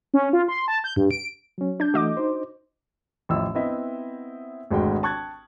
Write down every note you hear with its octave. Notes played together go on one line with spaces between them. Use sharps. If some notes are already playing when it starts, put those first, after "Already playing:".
C#4
F4
C6
A5
G6
G2
D7
F#3 C#4
D4 G6
E3 A3 F#4 D#5 D6
D#4 C5
A1 F3 E4 D#5 E6
B3 C4 E4 D#5 E5 G5
G#1 D2 G#3 F#4 G#4 G5
G5 A5 C#6 F#6 G#6 A6